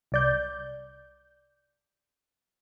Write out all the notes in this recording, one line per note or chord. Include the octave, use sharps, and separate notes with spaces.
C2 D5 G6